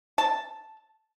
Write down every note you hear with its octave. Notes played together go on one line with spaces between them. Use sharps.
A5